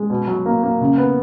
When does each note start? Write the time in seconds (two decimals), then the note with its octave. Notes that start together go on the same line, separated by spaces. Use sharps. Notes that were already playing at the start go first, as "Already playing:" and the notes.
Already playing: G#3
0.10 B2
0.27 F#3
0.46 A#3
0.63 A#3
0.81 C#3
0.98 B3